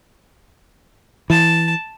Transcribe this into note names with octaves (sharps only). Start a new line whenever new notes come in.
E3 A5